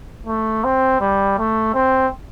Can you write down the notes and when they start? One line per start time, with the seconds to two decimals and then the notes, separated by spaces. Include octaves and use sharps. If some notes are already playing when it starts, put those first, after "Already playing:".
0.27 A3
0.64 C4
1.01 G3
1.38 A3
1.74 C4